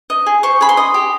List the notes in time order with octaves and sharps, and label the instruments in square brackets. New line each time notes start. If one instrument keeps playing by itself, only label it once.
[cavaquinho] D#5
G#4
C5 C#6
G#4 B5
C6
D#5
G4